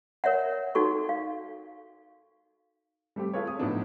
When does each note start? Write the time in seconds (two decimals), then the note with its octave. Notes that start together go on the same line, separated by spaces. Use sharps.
0.24 A#4 C#5 E5 F#5
0.75 D#4 F#4 A4 C#6
1.09 F5
3.16 G3 A3 C4 G4
3.33 F4 G#4 A4 B4 C#5
3.47 D#6
3.59 A2 F3 F#3 B3 D4 D#4